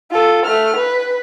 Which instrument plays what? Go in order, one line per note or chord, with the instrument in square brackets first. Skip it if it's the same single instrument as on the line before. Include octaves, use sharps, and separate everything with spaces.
[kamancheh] F4 A4
A3 F6
B4